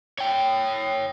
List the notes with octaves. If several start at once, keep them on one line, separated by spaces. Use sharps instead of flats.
C#5 G5